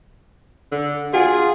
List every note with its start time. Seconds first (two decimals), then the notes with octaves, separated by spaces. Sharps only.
0.72 D3
1.14 F4 F#4 G#4 F#5 G#5